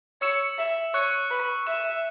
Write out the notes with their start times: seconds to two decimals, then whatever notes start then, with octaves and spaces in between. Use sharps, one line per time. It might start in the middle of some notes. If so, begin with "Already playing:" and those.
0.22 C#5 E6 C#7 E7
0.58 E5
0.94 C#5 C#6 F#6 C#7
1.31 B4
1.67 E5 C#6 F#6 E7